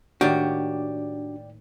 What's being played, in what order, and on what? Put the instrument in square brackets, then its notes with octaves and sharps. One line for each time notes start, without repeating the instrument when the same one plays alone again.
[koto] A2 D#3 A#3 [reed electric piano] D4 [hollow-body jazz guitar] F#4 G4 [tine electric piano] D5 G5